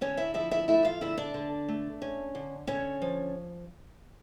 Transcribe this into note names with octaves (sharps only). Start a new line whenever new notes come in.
D3 C#4 C#5
E4 E5
F3 E4 E5
E4 E5
A3 E4 E5
F4 F5
D3 E4 E5
D4 D5
D3
A3
C#4
D3
D3 C#4 C#5
F3